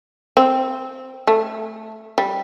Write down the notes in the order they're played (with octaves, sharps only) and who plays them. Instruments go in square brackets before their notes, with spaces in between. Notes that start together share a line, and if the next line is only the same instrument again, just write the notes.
[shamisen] C4
A3
G3